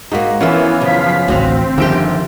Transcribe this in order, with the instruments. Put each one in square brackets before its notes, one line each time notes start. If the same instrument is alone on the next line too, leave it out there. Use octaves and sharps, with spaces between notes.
[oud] G#2 A#3 [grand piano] D#4 F#4
[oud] F2 A#4 E5 [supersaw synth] E3 [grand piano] B3 C#4 F4
[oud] F#2 C#3 [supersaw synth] F3 F5 B6
[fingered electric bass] A1 D2 [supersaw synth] C4 [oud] F#4 D#5 F5
[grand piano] G1 D7 [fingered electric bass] D3 D#3 F3 [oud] G4 E5